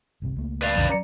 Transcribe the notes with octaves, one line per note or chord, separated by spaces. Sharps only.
G1 C2 C3
C#2 A3 A#3
B4 D5 F5
B1 F2 D3
F#3 C#4 D5 A#5 C#7